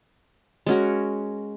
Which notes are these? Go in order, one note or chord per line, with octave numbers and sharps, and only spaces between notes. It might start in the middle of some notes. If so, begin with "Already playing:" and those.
G#3 C#4 F#4 A#4